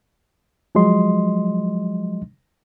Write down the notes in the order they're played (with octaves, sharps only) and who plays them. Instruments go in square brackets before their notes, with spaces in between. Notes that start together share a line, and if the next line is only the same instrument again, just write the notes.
[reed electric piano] F3 F#3 G#3 D#5 C6